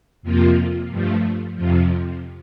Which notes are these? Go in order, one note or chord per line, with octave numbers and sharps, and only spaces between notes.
F2 C3 F3 A#3 F4
G2 F3 A3
F2 C3 F3